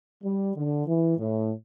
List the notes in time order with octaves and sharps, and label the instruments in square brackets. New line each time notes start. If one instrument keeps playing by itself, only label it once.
[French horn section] G3
D3
E3
A2